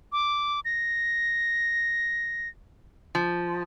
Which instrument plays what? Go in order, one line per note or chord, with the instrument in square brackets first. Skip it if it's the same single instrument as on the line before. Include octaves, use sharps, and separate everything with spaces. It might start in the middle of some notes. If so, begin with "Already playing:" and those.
[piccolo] D6
A#6
[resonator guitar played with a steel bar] F3